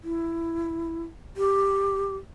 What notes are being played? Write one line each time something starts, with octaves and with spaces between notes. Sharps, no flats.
E4
G4